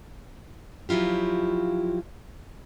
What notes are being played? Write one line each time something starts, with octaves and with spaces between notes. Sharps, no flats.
F3 F#3 E4 F4 G4